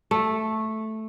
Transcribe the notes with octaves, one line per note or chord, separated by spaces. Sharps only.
A3